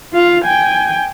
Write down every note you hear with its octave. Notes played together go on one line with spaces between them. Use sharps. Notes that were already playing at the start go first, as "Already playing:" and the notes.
F4 F5
G5 G#5